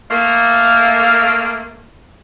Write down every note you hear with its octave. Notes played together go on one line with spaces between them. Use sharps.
A3 A#3